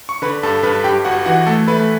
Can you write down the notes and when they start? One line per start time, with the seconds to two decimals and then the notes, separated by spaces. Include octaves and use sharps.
0.09 C#6
0.22 D3 B4 B5
0.43 G2 A4 A5
0.63 G2 B4 B5
0.84 G2 G4 G5
1.05 G1 F#4 F#5
1.26 E3 F#4 F#5
1.46 A3 A4 A5
1.68 A3 B4 B5